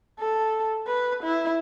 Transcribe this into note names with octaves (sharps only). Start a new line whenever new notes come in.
A4
B4
E4